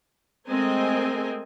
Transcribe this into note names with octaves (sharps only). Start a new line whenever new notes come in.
G#3 A3 C4 A#4 D#5 G#5